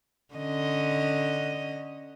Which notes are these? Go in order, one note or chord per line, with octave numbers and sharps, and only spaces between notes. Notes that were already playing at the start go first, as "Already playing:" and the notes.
D3 C#4 D#5